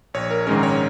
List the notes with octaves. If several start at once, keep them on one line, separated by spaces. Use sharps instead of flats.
A#1 C#5
A#4
G#2 D#3 G#3 C#4 A#4
C#5